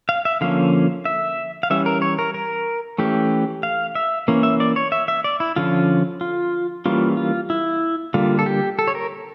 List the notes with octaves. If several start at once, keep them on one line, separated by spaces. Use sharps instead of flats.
F5
E5
D3 F3 A#3 C#4 F5
E5
F5
E3 G3 C#4 E5
A#4
C#5
A#4
A#4
E3 A3 C#4 G4
F5
E5
E3 A#3 C#4
E5
D5
C#5
E5
E5
D5
E4
D3 F3 C#4 F4
F4
E3 G3 A#3 C#4 F4
F4
E4
D3 G3 A#3 F4
A4
G4
A4
C#5
A#4